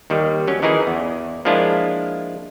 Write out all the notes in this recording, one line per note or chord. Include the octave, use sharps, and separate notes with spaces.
D#2 D#3 G3
F#3 C#4
D#3 E3 D#4 E4 G#4
E2
F3 G#3 A#3 D4 E4 F4